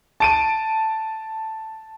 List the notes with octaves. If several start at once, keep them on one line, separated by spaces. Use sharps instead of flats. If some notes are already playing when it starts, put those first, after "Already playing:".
A5 D7 D#7